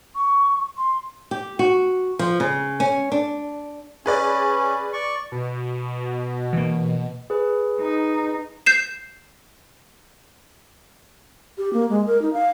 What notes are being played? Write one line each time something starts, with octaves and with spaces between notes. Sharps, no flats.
C#6
C6
G4
F#4
F3
C#3
C#4
D4
C#4 G#4 B4 D5
D5 C#6
B2
E3 A#3
G#4 B4
D#4
G6 C7 E7
G4
A#3
G#3
A#4
D#4
F5